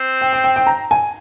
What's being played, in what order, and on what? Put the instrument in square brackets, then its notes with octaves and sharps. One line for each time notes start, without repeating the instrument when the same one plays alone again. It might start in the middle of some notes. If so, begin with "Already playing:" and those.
Already playing: [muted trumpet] C4
[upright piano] G5
G5
G5
G5
A#5
G#5